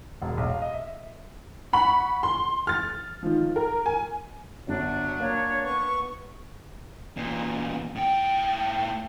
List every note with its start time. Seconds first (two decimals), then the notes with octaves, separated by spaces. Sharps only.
0.21 E1
0.37 B1
0.50 F5
0.62 D#5
0.74 E5
1.73 F#5 B5 C#6 F#7
2.23 C6
2.67 F6 A6
3.23 D#3 F3
3.56 A#4
3.86 G#5
4.68 G1 F#3 D4
5.20 A#3 C#5
5.64 B3 C#6
7.17 E2 A#2
7.96 A2 G5